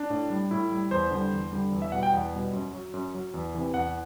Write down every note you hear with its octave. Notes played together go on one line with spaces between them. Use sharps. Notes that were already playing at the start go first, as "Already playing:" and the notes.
Already playing: D4
A2
G3
A2 E4
G3
E2 C5
D3 G3
E2
D3 G3
E2
E5
B2 G3 F#5
G5
E2 F#5
B2 G3
F#2
F#3
F#2
F#3
E2
C3 E3
E2 F#5